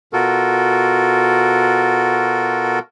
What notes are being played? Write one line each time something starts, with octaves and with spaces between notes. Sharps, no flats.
B2 F4 F#4 A4 A#4